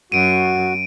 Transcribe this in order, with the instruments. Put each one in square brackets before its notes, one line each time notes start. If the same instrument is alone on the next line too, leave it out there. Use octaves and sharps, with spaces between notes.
[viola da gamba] F#2 [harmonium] F#4 [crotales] D7 D#7